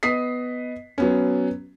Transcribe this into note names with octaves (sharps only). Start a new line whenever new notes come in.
B3 D#5 D#6 B6 C7
F#3 B3 C#4